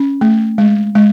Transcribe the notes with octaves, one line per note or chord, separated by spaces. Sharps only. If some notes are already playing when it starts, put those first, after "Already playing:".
Already playing: C#4
A3
G#3
G#3